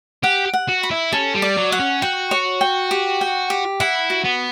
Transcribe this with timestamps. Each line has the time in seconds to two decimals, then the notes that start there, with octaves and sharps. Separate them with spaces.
0.23 G4 F#5
0.53 F#5
0.68 F#4
0.83 B5
0.91 E4
1.13 C#4 A4
1.35 G3
1.42 D5
1.57 F#3
1.72 F#5
1.79 C#4
2.02 F#4 G5
2.31 C#5
2.61 G5
2.91 G4
3.21 G5
3.50 G4
3.80 E4 F#5
4.10 F#4
4.25 B3